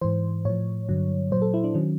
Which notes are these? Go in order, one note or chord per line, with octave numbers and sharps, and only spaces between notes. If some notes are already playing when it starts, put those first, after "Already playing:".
G#2 E3 C5
A2 F3 C#5
G2 D3 F#3
A#2 F#3 C5
A4
E4
D4
D#3 F#3 C#4